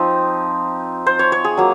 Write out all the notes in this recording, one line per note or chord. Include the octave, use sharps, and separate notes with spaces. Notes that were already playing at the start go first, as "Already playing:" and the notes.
Already playing: F3 C4 D#4
C5
C#5
C#5
G#4
F#3 A#3